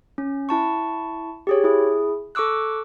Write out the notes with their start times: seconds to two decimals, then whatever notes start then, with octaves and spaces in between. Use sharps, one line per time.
0.18 C#4
0.49 E4 A5 C#6
1.47 G4 G#4 C#5
1.64 E4 G#4
2.35 A4 C#6 D6 E6 F#6